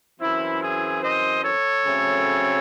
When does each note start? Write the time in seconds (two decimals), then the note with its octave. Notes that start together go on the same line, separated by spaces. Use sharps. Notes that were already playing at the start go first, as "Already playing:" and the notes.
0.20 F#2 E3 C4 E4
0.61 E4 G#4
1.02 C5 D#5
1.44 A4 C#5
1.85 C#3 F#3 A3 C4